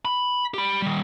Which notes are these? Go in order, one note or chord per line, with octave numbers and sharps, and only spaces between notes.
B5
G4 B5
D#3 G3